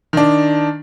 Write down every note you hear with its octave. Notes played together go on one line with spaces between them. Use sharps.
D#3 D4